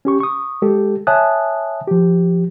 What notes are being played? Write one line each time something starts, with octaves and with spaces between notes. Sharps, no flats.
C#4 G4 C#6
C#6 D#6
G#3 G4 A4
C#5 E5 G#5 A5 D#6 F#6
F3 G4